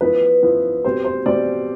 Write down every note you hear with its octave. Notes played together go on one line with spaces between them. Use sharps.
F3 B3 E4 B4
F3 B3 E4
B2 G3 C4 C5
C5
B2 G3 C4 D5